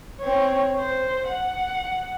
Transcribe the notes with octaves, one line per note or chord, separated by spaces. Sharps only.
C4 C#5
C5
F#5